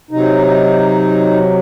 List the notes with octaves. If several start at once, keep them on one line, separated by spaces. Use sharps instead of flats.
C3 F#3 D#4